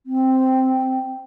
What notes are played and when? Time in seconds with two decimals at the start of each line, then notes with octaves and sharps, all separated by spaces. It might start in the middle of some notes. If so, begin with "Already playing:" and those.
0.06 C4